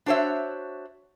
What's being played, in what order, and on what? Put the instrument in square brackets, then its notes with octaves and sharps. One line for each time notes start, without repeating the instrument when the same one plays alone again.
[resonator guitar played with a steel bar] D4 F#4 C5 C#5 E5